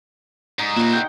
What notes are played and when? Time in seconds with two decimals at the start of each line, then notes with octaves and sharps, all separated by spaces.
0.59 G#2 D#4
0.76 A#2 C4 E4 F#4
0.93 F#5 G5